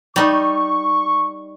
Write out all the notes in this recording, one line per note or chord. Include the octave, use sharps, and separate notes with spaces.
G3 D#4 C#6